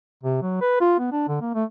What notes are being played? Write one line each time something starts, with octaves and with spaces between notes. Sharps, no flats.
C3
F#3
B4
F4
B3
D4
D3
A#3
A3